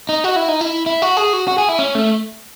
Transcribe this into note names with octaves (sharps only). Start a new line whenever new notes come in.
D#4
F#4
E4
D#4
E4
E4
F#4
G#4
F#4
F#4
G#4
E4
C#4
A3